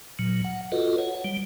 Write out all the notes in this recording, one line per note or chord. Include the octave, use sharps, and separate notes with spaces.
A#2 F#3
F#5
F4 F#4 A4 B4 D#5
C#5 F#5
G3